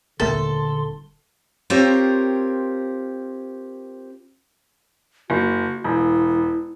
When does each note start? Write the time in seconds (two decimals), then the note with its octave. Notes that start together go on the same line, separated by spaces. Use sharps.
0.20 D#1 D3 A3 D4 A4 A#4 C6 A6
1.70 C4 F4 G4 A#4 C5 C#5
5.30 F#1 F#4
5.84 E1 E4